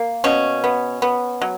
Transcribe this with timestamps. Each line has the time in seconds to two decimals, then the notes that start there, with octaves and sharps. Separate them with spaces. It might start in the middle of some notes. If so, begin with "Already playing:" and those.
Already playing: A#3
0.24 B2 C#4
0.64 B3
1.02 B3
1.42 F#3